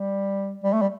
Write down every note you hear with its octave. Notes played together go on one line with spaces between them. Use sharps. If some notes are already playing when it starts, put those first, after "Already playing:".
Already playing: G3
G3
A3
G3